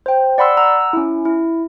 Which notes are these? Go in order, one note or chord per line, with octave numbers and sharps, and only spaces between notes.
C5 G5
D5 F#5 B5 C6 E6
F#5 A#5 E6
C#4 E4
E4